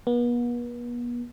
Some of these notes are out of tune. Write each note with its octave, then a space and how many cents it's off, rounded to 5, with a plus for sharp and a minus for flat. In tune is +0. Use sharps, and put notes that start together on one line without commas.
B3 -40